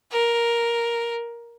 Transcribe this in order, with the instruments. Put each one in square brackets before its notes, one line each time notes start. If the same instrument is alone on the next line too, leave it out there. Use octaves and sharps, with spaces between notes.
[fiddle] A#4